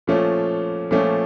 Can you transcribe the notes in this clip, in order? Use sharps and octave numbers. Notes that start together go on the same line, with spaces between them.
A#2 F3 A3 C#4
A#2 F3 A3 C#4